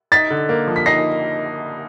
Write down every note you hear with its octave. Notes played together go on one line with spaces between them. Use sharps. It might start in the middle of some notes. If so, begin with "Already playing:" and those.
D#4 A6 B6
D3
A#3
F3
B6
D#4 A#6 C7